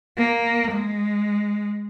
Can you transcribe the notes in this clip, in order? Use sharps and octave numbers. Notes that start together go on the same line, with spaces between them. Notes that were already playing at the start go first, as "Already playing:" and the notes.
A#3
G#3